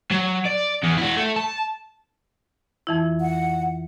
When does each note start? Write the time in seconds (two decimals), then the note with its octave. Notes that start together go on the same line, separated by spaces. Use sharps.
0.12 F#3
0.46 D5
0.84 E2
0.98 E4 F#4
1.17 A3
1.36 A5
2.87 F2 E3 E4
3.21 F#5